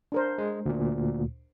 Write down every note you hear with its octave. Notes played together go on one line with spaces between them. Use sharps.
D4 A#4 C5
G#3
D2 A#2